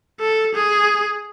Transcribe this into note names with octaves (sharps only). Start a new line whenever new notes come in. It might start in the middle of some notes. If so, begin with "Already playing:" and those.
A4
G#4